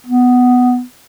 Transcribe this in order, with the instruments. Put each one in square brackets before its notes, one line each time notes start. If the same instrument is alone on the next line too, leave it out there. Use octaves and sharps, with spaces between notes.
[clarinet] B3